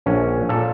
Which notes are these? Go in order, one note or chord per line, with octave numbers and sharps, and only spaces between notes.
A#1 C#4
A#2 A4